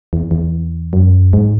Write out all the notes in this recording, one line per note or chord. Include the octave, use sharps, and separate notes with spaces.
E2
E2
F#2
G#2